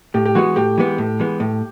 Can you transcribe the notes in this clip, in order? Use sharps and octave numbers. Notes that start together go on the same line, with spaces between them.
A2 G4
G4
E3 G#3 B3 F#4
A2 G4
E3 G#3 B3
A2
E3 G#3 B3
A2